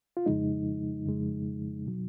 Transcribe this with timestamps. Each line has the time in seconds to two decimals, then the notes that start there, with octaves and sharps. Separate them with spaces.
0.17 F4
0.26 F2 C#3 F3 G#3 D#4
1.06 F2 C#3 F3 G#3
1.86 B2 F#3